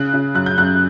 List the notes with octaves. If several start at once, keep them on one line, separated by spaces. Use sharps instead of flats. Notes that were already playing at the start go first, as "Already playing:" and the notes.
Already playing: C#3 F#6
C#3
F#2 F#6
G6
F#2 F#6